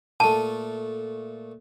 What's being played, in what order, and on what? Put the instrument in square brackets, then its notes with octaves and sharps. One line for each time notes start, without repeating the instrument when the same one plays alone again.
[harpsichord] A#2 A3 [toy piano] A5